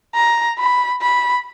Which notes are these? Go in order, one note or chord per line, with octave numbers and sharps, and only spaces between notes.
A#5
B5
B5